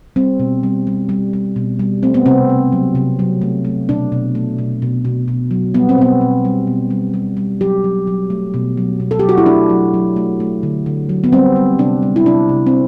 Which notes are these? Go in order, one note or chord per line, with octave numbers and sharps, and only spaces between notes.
G3 C4
B2
G3
G3
G3
G3
B2
G3
A3 C4
B3
C3 C4
C3
F#3
C3
F#3
A3
A3
B2 D4
B2
A3
B2
B2
B2
B2
F#3
G3 B3
C4
B2 B3
B2
G3
B2
G3
G3
G3
F#3 G4
F#3
F#3
A3
B2
F#3
B2
A4
F#3 G4
F#4
E4
A3 D4
F#3
F#3
A3
A3
D3
D3
F#3
B3
G3 C4
G3
C3 D4
G3
E4
C3 D4
C3
C4